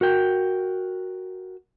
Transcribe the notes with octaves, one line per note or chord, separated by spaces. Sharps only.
F#4 A#4 G5